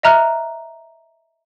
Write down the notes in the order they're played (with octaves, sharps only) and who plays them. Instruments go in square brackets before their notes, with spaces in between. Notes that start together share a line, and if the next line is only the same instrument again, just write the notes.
[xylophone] D#5 E5 A#5 F6 F#6